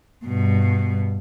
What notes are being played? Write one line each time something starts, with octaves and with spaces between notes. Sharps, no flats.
G2 B2